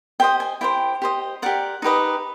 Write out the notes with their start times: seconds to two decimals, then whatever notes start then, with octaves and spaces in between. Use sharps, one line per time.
0.20 G4 C5 D#5 G5
0.40 G#5
0.61 E4 G4 C5 G5
1.02 G4 C5 D#5
1.42 G4 A#4 D5 F#5
1.82 D#4 G4 B4 D#5